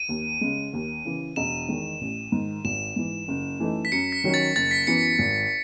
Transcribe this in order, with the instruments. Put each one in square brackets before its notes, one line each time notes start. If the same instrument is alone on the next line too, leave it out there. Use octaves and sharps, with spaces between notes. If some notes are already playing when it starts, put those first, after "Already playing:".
Already playing: [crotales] D#7
[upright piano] D#2
C#3 G#3
D#2
C#3 E3
[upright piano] E1 [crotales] E7
[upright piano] E2 D#3 G#3
A1
G#2 D#3
[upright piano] G#1 [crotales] E7
[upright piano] G#2 E3
F#1
F#2 E3 A3 D#4
[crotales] B6
[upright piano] F#2 [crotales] C#7
[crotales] B6
[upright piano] D#3 F#3 C#4
[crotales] A6
[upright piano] F#1 [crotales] A6
[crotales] B6
[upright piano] F#2 E3 B3 [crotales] C#7
[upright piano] G#1